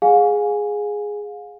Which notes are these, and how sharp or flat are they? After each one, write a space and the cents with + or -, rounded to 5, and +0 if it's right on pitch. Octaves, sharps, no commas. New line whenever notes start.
G#4 +0 F5 +35 G#5 -5